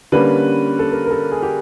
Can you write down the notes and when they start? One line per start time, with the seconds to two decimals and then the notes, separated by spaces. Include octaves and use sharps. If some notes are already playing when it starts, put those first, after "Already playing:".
0.12 D3 G3 A#3 C#4 B4
0.79 A4
0.92 A#4
1.06 A#4
1.11 A4
1.32 G#4
1.42 G4